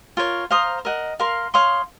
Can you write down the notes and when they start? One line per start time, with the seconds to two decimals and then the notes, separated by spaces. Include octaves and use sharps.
0.17 F4 A#4 C#5
0.51 C5 F5 A#5 D#6
0.85 A#4 D#5 F#5
1.19 A#4 F5 C6
1.54 C#5 F5 C6 D#6